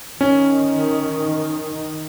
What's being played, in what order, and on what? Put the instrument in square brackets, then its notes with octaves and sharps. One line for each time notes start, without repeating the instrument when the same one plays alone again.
[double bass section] D#3 [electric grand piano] C#4